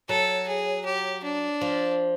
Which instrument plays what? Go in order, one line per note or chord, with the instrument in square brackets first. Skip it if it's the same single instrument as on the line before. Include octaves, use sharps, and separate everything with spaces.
[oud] F#3 [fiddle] A4
[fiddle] G#4
G4
D4
[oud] F3